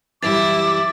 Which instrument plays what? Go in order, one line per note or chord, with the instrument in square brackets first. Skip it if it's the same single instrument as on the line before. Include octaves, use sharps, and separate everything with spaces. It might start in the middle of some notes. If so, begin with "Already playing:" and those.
[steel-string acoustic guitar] F#2 E3 G3 [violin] E4 [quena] D6 [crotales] A6 D7